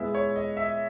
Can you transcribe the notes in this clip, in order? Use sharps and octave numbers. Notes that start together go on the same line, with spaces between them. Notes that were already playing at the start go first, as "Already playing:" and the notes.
Already playing: A#2 G#3 B3 E4 E5
C#5
D#5
E5